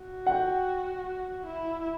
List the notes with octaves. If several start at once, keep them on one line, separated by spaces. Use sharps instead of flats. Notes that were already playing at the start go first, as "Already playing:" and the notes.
Already playing: F#4
F#5
G5
E4